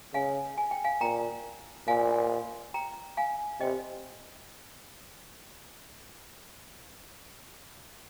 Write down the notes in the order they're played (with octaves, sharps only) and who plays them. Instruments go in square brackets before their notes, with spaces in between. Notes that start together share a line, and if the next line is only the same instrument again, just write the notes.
[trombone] C#3 [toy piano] F5 G#5
[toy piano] G#5
G5
F5 G#5
[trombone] A#2 [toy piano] G5 A#5
[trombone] A#2 [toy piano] F5 G#5
[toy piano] G5 A#5
F5 G#5
[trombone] C3 [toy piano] D#5 G5